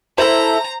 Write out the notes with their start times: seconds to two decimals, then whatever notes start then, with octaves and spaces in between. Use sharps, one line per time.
0.18 E4 A4 C5 A#5